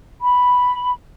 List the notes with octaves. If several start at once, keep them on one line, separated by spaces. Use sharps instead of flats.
B5